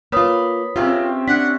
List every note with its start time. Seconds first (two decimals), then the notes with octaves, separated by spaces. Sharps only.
0.12 A#3 F4 B4 C#5 B5 D#6
0.76 C3 C4 C#4 F4
1.28 D4 F#5 B6